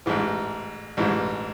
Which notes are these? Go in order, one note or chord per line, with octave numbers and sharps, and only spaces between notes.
A1 G#2 E3
A1 G#2 E3